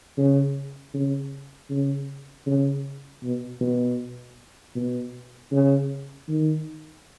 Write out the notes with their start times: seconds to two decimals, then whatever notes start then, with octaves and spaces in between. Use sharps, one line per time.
0.17 C#3
0.94 C#3
1.70 C#3
2.46 C#3
3.23 B2
3.61 B2
4.75 B2
5.52 C#3
6.28 D#3